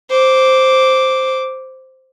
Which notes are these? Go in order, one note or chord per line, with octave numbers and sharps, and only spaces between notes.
C5 D6